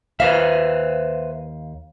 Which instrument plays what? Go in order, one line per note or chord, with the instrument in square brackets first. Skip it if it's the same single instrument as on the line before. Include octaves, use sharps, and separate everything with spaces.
[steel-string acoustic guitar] D#2 F5 [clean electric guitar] B4 C5 E5